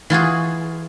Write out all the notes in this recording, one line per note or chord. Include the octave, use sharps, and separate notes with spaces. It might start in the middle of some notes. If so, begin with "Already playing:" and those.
E3 F4 F#4 G#4